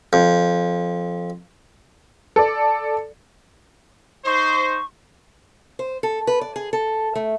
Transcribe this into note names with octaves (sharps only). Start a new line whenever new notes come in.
F2
A4 D5
D#4 C5 C#6
C5
A4
B4
D5
G#4
A4
A3